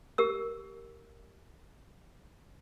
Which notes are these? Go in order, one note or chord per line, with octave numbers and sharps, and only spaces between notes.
G4 A#4 E6